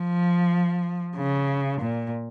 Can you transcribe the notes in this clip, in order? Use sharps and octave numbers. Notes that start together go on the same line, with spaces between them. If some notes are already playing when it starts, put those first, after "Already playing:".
Already playing: F3
C#3
A#2